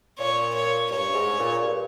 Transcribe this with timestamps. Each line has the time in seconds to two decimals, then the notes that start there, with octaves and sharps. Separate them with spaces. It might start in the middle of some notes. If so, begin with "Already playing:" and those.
0.18 A#2 C#5
0.54 C#5
0.90 G2 C#5
1.14 G#2
1.38 A#2
1.62 G2